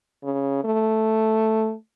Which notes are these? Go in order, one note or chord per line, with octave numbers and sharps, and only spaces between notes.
C#3
A3